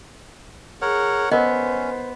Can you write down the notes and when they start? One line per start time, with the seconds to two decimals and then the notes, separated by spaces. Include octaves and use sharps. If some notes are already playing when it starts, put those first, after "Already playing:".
0.82 G#4 A#4 C#5 F#5
1.31 B3 C#4 A#4 C5 D#5